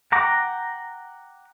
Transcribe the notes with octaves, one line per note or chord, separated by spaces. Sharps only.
F#5 G5 A#5 D6